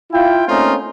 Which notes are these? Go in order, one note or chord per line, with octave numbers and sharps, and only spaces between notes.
E4 F4 G5
A3 A#3 C4 C#4 D#4 F4